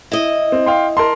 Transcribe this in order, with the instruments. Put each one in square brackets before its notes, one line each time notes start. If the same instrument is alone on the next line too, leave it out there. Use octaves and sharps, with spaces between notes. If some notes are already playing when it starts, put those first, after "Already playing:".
[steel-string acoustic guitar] E4 D#5
[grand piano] C4
F5 G5 C6
A#4 A5 C6